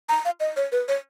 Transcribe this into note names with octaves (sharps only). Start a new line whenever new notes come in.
A#5
F5
D#5
C#5
B4
C#5